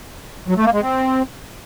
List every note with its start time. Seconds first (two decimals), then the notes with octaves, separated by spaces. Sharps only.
0.48 F#3
0.57 A3
0.65 A#3
0.73 G#3
0.82 C4